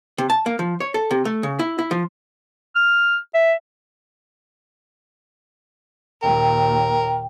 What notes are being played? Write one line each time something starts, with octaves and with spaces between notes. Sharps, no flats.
C3
A5
A#3
F3
C#5
A4
C3
A3
C#3
E4
E4
F3
F6
E5
D#2 A#2 A#4 G5